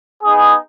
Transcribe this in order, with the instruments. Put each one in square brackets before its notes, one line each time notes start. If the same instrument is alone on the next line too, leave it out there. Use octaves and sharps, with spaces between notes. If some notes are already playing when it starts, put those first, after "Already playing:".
[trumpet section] B3 D#4 G#4